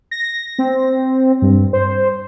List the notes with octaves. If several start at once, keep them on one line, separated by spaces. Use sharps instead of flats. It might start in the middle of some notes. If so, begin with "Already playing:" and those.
A#6
C4
G2
C5